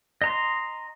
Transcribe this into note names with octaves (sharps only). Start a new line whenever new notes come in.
D#5 A#5 C6